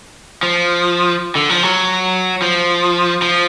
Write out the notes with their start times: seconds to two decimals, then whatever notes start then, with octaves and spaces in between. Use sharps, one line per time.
0.43 F3
1.35 D3
1.49 F3
1.63 F#3
2.42 F3
3.22 F3